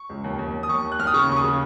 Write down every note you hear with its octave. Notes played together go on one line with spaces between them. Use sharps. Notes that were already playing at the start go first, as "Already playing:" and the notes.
Already playing: C#6
C#2
D#2
D#2
D#2
D#6
D#2 C#6
D#2
F#6
D#2 F6
D#6
C#3 C#6
D#2 C#6
D#6
C#3